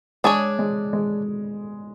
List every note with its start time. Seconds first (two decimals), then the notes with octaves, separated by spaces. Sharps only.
0.24 G#3 D4 G#4 C#5
0.59 G#3
0.93 G#3